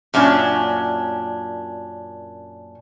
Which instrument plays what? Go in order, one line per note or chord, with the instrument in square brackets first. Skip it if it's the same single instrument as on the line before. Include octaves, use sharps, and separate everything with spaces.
[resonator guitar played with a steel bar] F#2 A#2 C#4 D4